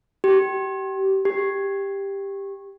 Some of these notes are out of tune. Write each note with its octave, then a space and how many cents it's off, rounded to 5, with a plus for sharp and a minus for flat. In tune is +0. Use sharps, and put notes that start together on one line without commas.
G4 -25
G4 +10